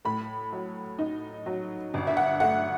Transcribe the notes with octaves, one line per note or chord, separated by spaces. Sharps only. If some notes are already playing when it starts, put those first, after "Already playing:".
A2 B5
F#3
D#4
F#3
G1
E5
F#5
A3 F#5